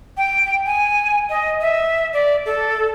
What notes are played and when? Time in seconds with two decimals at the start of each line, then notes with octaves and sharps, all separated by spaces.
0.17 G5
0.66 G#5
1.30 D#5
1.61 E5
2.13 D5
2.46 A4